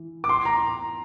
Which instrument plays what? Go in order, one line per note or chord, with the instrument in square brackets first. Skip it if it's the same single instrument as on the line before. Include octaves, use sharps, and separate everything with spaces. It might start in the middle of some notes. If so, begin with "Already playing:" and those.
Already playing: [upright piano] E3
[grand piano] D6
C6
A#5